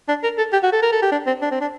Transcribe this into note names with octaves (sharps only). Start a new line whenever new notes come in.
D4
A#4
A4
G4
F#4
A4
A#4
A4
G4
D4
C4
D4
C4
D4